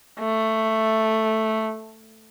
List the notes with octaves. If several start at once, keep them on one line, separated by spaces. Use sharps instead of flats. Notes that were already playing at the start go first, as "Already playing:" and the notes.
A3